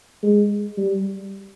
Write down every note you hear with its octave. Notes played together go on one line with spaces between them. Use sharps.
G#3
G3